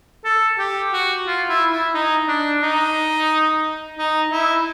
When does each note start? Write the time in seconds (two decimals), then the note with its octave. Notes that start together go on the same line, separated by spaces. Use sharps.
0.24 A4
0.59 G4
0.93 F#4
1.27 F4
1.49 E4
1.72 E4
1.94 D#4
2.28 D4
2.63 D#4
3.98 D#4
4.31 E4